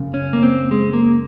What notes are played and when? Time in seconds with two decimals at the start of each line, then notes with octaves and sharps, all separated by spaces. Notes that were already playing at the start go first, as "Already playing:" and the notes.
Already playing: F#2 C#3
0.14 C#4
0.33 A#3
0.43 C4
0.71 G#3
0.93 A#3